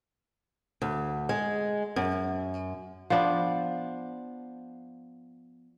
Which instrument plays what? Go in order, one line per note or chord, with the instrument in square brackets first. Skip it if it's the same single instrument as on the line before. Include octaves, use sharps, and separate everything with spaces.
[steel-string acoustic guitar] D2
G#3
F#2
[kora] F3 B3 D4